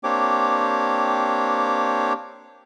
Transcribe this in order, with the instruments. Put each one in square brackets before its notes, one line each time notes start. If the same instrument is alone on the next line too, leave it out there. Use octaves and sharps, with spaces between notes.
[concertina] A#3 C4 D4 G4 C#5 D6